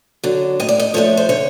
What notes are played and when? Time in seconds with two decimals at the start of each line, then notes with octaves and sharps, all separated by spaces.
0.23 D3 F#3
0.60 A2 D#5
0.69 D5
0.80 D#5
0.94 F3 A3 D4 C#5
1.17 C5
1.29 D3 C#5